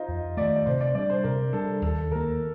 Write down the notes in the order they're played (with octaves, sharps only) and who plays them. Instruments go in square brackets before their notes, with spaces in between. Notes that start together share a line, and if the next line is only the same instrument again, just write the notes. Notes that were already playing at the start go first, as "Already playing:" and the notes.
Already playing: [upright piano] D#4 F4 C5
[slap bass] F2
[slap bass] D#3 A3 [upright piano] D5
[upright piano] D5
[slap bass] C3 [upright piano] C5
[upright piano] D5
[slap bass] G3 D4 [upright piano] D5
[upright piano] C5
[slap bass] C3 [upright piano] A#4
[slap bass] G3 D4 [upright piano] A4
[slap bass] D#2 [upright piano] A4
[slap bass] D#3 A#3 [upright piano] A#4